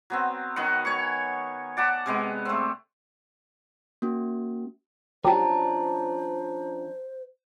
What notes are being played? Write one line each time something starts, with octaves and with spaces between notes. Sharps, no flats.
F#3 B3 C4
D#3 F#3 B3 F#5
C#5 G#5 C#6
D5 F#5 A5 B5
C3 G#3 B3
A3 C4
A#3 C#4 F#4
F3 F#3 C#4 D4 G4 C5 A5 A#5